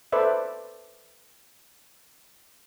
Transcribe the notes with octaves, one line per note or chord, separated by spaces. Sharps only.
A4 B4 C5 D5 E5